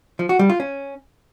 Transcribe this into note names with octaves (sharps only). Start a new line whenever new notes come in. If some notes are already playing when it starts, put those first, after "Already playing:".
F3
F#4
G3
F4
C#4